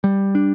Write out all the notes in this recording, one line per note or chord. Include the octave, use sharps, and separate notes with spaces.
G3
D4